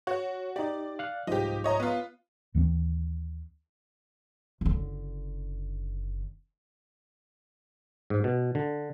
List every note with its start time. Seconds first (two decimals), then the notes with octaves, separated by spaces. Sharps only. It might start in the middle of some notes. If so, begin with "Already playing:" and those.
0.07 F#4 C#5
0.56 D#4 G4 D5
0.99 F5 F#6
1.27 C2 G#2 F3 D#4 G4
1.64 C#5 D#5 A#5
1.80 B3 F4
2.55 D#2 E3 A3 C4
4.61 F#1 D3
8.10 G#2
8.24 B2
8.55 D3